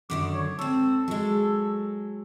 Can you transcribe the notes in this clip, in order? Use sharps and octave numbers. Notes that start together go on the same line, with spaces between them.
F#2 D3 D#3 D6
C#5
G#2 C4 A4
F#3 G#3